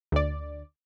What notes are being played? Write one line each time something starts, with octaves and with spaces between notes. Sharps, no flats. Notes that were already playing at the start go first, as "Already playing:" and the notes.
D2 D5